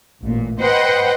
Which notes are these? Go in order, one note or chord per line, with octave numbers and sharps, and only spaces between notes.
A1 A#2
B4 C5 D#5 F#5 G5